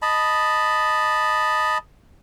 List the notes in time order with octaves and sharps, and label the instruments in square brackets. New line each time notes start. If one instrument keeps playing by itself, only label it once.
[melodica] D#5 A5 B5